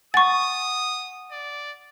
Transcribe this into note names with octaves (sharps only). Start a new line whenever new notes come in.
F#5 G#5 C#6 D#6 A6
D5